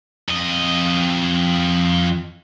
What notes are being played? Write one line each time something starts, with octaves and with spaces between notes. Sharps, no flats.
F2 D#5